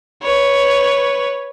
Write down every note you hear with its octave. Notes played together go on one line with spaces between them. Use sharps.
B4 C#5